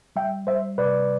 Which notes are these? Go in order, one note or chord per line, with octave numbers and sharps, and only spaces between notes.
G3 E5 G5
G3 C5 E5
C3 B4 D5